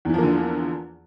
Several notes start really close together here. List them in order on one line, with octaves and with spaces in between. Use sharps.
E2 E3 F3 A#3 D3